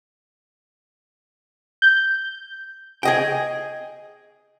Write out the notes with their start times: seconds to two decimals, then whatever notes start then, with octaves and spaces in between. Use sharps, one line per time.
1.82 G6
3.03 G#4 D#5 G5